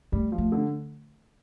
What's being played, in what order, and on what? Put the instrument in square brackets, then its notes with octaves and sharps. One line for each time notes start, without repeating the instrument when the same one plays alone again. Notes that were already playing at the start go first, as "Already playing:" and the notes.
[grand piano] G3 [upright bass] A3
[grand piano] F3
[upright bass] A3
[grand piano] D3